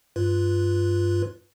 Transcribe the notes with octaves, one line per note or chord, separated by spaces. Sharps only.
G2 F4 B4